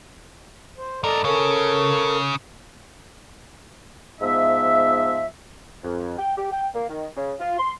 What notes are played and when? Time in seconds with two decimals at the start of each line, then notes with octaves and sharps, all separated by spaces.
0.78 C5
1.04 G2 A4 A#4 D5 D#5
1.25 C#3 C#4 A4 A#4 C#5
4.21 G#2 F3 B3 D#5 E5
5.83 F2
6.18 G5
6.37 G4
6.52 G5
6.74 A#3
6.88 D#3
7.16 C#3
7.40 F4
7.58 C6